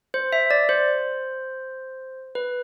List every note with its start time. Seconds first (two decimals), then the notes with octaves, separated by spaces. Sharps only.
0.14 C5
0.33 E5
0.51 D5
0.69 C5
2.35 B4